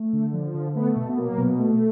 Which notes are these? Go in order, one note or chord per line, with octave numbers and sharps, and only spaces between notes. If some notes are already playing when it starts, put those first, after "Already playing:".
Already playing: A3
D3
F3
D3
A3 B3
B2
B3
F#3 A#3
B2
A3